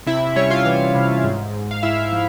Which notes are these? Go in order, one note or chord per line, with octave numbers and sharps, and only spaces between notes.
C3 E4 E5
G3 C#4 C#5
F4 F5
E3
C3
G#2
G#2
F5
G#2 E4 E5
F3